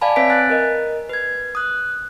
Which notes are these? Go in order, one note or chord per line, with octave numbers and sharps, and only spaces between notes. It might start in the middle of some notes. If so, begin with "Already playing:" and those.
D5 F5 G#5 A5 B5
C4 B4 C#5 E5 B6 D7
G#5 F#6 A6
A#4 D#5
B4 G#6
D#6 F#6